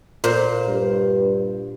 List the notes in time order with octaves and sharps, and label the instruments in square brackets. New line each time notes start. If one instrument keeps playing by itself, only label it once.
[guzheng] A#2 C5
[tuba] G2